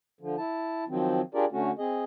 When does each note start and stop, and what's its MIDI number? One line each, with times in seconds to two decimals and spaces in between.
0.21 0.36 50
0.21 0.36 53
0.37 0.84 64
0.37 0.84 81
0.89 1.21 51
0.89 1.21 53
0.89 1.21 54
0.89 1.21 60
1.34 1.45 62
1.34 1.45 65
1.34 1.45 67
1.34 1.45 68
1.34 1.45 70
1.34 1.45 74
1.52 1.71 50
1.52 1.71 57
1.52 1.71 61
1.52 1.71 66
1.79 2.04 60
1.79 2.04 68
1.79 2.04 75